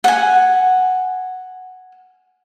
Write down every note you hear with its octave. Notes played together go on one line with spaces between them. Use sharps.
F#5 G#5